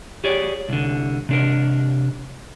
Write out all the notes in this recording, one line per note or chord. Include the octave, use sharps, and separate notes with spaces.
G4 G#4 C#5 D5
C2 D3
C3 D4 A#4